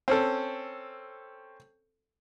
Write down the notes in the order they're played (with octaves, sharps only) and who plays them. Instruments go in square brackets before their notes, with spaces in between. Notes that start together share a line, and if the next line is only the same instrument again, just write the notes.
[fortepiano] C4 C#4 A4